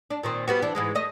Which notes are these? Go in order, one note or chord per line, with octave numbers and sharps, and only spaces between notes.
D4
A#2 D#3 C4
G3 B3 F#4
E3 D4
G#2 E3 G#3
A3 D#5